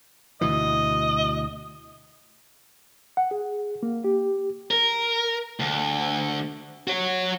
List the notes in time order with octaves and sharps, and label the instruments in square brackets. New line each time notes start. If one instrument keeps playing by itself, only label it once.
[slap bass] D2 B2 E3 [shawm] D#5
[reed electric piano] F#5
G#4
A#3
G4
[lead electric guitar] A#4
D2
F#4 C#5